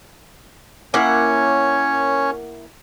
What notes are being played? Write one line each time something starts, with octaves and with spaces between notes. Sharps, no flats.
A#3 C#4 E4 C#5 F#5